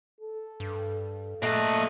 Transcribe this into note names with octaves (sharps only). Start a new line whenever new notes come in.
A4
G2
A#2 A3 A#3 D#5 A5 F#6